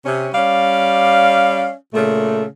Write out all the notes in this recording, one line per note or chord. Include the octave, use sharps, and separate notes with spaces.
C3 C#4
G3 C#4 D5 F5
A#2 C#3 A3